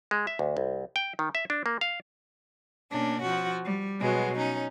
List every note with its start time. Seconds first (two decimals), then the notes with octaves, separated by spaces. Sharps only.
0.11 G#3
0.27 E5
0.39 D2
0.57 C2
0.96 G5
1.19 D#3
1.35 E5
1.50 D4
1.66 A#3
1.81 F5
2.91 B2 A#3 C#4 D4
3.23 F3 F#4
3.64 G3
3.99 B2 F#3 G#3 B3
4.38 C#4 D#4